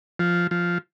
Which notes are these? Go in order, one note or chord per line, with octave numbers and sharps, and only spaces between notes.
F3
F3